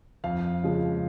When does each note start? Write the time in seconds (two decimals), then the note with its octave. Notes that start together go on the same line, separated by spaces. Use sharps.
0.24 F2 F5
0.64 C#3 F3 G#3